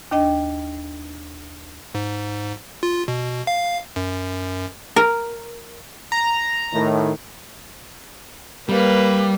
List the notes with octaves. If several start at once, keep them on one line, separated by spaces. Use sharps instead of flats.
D#2 D4 D#5 G5
G#2
F4
B2
F5
F#2
A#4
A#5
A2 D#3
G3 A#3 B4